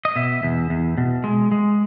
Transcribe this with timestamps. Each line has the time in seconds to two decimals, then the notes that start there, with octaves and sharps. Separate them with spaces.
0.05 D#5
0.16 B2 E5
0.43 E2
0.70 E2
0.98 B2
1.24 G#3
1.52 G#3